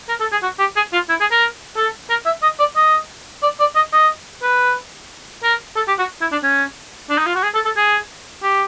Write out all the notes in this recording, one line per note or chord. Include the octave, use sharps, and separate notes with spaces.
A#4
A4
G#4
F#4
G4
G#4
F4
E4
G#4
A#4
A4
A#4
E5
D#5
D5
D#5
D5
D5
D#5
D#5
B4
A#4
A4
G4
F#4
E4
D4
C#4
D4
D#4
F4
F#4
G#4
A4
A4
G#4
G4